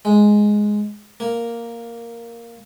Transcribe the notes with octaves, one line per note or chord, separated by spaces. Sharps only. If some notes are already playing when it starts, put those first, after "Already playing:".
G#3
A#3